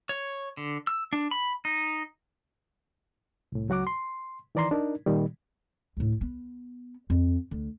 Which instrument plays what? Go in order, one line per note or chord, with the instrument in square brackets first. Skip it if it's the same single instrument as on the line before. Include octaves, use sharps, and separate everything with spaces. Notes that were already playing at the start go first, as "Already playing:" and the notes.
[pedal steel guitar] C#5
D3
E6
D4
B5
D#4
[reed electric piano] C2 A2
C#2 F#3 F#4 F#5 D6
C6
D#3 E3 D5 A#5 C6
D4 D#4 A#4
A#2 D#3 G3
[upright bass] D2 A2
B3
F2
D2